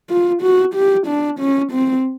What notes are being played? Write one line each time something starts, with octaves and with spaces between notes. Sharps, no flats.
F4
F#4
G4
D4
C#4
C4